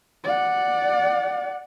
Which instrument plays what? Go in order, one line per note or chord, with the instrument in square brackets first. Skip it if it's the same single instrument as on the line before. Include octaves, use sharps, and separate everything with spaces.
[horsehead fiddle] D5 F#5